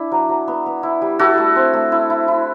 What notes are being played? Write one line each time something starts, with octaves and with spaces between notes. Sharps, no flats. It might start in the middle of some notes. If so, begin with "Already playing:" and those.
Already playing: D4 E4
F#3
F#3
B3
B3
E4
G3
E4 F#4 A4
A3
C4
A3
E4
E4
E4